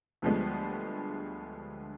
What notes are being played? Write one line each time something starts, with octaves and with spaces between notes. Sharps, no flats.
D2 D3 F3 G3 G#3 B3